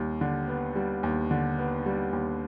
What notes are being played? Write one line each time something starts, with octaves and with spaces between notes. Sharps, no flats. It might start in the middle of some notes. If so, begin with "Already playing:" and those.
Already playing: D#2 G3
D3
B3
G3
D#2
D3
B3
G3
D#2